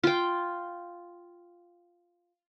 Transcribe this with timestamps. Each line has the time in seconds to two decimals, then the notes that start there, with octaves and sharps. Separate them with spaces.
0.04 F4 G5